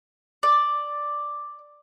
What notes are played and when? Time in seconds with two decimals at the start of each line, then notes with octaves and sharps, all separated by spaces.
0.43 D5